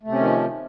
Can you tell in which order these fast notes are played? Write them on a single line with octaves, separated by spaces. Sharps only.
A3 C3 C#4 D#3 F3